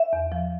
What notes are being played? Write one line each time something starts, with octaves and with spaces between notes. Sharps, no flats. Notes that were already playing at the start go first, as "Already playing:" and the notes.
Already playing: E5
E2
F3